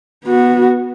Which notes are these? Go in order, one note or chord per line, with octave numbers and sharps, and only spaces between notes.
B3 F#4